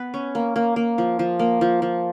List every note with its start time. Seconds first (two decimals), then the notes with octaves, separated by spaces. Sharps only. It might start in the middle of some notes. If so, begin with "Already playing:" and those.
Already playing: B3 B4
0.14 C#4
0.35 A#3
0.56 A#3
0.76 A#3
0.98 F3
1.19 F3
1.39 A#3
1.61 F3
1.82 F3